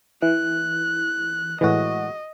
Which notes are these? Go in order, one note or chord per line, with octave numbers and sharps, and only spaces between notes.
E3 F#6
A2 E3 G#3 F#4 D#5